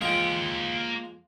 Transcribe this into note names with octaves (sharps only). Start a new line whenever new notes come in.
F3 G#3 A#3 F4 G5